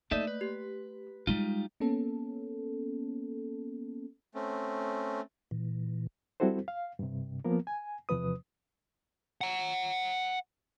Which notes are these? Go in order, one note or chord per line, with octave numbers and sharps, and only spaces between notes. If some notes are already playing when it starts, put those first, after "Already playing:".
A3 A#3 D#4 A4 D5 E5
B4
G4
G3 G#3 D#4 F4
A#3 B3 C#4 A4
A3 C4 C#4
A#2 E3
G3 C4 E4 F#4 A4 C5
F5
G2 C3
F3 A#3 B3 A#4
G#5
E2 C3 F3 B4 D#6
F#5 A#5